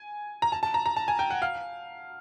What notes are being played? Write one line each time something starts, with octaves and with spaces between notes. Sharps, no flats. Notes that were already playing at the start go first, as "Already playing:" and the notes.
Already playing: G#5
A#5
A5
A5
A#5
A#5
A5
G#5
G5
F#5
F5